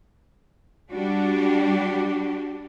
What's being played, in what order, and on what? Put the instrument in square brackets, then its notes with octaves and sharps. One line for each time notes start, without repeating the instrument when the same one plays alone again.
[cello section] G3 D4 F#4 G4